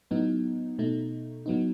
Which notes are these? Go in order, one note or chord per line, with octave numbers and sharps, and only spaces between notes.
A2 F#3 B3 D#4
B2 A3 D#4
A2 F#3 B3 D#4